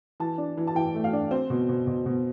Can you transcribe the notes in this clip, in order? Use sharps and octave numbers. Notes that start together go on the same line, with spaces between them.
E3 A5
D4
E3
A5
E3 G5
A3
F5
D4
C4 C5
B2
B2
B2
B2